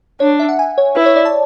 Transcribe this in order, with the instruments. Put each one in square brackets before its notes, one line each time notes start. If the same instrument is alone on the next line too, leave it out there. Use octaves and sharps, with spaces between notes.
[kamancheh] D4 [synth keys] C#5
[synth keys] E5
F#5
G#5
C#5
[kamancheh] E4 [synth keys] B4
[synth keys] C#5
D5
A5